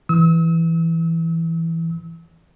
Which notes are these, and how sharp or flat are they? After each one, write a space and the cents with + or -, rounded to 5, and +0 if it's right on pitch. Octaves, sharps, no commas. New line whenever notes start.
E3 +0 E6 -40